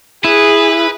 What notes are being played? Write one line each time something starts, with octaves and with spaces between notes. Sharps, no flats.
E4 G#4 B4